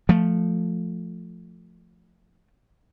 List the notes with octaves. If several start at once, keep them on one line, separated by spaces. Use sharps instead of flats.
F3 A3